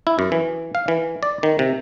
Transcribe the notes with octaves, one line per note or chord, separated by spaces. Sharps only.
E4
F#2
E3
F5
E3
D5
D#3
C3